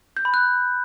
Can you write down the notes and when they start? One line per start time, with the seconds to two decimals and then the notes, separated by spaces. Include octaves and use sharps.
0.17 G6
0.25 B5
0.34 F#6